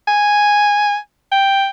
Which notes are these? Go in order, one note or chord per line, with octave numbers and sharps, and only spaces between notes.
G#5
G5